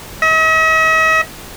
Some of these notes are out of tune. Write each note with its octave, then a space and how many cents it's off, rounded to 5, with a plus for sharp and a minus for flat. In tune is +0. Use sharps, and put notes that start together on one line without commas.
D#5 +45